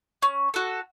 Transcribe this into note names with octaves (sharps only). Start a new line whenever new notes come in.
C#4
F#4 A4